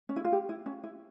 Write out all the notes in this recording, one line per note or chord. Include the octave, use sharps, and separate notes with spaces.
C#4
E4
F4
G4
E4
C#4
E4